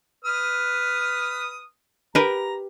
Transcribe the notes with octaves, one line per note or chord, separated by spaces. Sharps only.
B4 D#6 F6
G4 A#4 B4 A#5